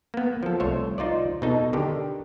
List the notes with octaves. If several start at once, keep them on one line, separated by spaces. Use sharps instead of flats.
A#3 B3
F3 A4
C2 A3 C5 C#5
D#4 F4 C5 D5
B2 D#4 A4
D3 D#3 G4